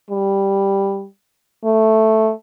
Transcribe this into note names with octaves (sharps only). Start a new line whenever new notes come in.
G3
A3